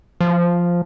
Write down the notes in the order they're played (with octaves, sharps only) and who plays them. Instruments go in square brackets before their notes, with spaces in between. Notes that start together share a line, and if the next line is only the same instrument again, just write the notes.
[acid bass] F3